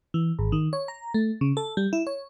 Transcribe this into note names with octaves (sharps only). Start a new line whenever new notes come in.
E3
G#1
D#3
C#5
A#5
A3
C#3
A4
G3
E4
C#5